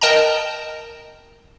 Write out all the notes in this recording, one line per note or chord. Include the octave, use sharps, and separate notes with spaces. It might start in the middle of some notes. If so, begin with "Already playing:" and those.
A#4 D#5 G5 A5 A#5